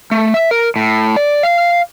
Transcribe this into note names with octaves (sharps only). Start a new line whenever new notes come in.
A3
E5
A#4
A2
D5
F5